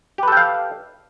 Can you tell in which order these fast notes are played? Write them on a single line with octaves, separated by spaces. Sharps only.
G4 B4 A4 G5 F5